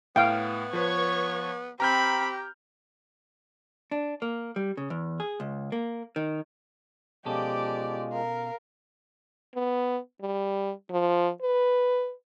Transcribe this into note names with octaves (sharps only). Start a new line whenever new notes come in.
A2 B3 F5 G5
F3 B4 C#5 C#6
C4 G4 A#5 B5 F6 G6
D4
A#3
G3
C#3
E2
G#4
C#2
A#3
D#3
B2 F3 G#3 C#4 G4 A4 D5
A#4 F5
B3
G3
F3
B4